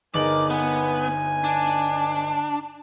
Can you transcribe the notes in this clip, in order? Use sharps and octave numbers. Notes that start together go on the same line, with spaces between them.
G1 D#4 G#4 A#4 D5 F#7
B3 G#5
D4